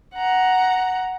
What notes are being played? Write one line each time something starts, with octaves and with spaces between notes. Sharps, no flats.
F#5 A#5